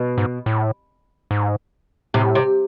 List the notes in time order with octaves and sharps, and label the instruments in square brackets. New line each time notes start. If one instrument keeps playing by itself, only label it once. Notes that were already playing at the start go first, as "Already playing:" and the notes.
Already playing: [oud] B2
[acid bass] G#2
A2
G#2
[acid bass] A2 [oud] C3
[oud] C3